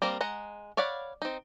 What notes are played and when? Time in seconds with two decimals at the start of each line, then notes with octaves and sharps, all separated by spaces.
0.02 G3 A#3 C4 A#4
0.21 G#3 F#5 A#5
0.77 C#5 D5 F5 F#5 B5
1.22 C4 D#4